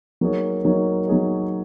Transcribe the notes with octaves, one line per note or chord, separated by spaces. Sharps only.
F#3 A#3 D#4 G#4 C#5
F#3 A#3 D#4 G#4 C#5
F#3 A#3 D#4 G#4 C#5